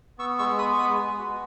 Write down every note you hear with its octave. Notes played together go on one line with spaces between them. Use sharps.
B3 C#6 E6
G#3 C#6 E6
B3 B5 D#6
C#6
G#3 B5 D#6
G#3
F#4